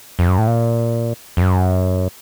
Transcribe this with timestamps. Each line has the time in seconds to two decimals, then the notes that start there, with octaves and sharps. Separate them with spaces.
0.19 F2
0.28 F#2
0.38 A2
0.47 A#2
1.37 F2
1.42 F#2